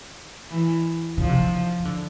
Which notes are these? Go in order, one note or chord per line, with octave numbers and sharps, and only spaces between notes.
E3
D3 F3
C3
D3
E3
D3